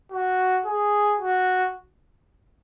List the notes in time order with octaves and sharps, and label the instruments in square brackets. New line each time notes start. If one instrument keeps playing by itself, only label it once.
[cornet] F#4
G#4
F#4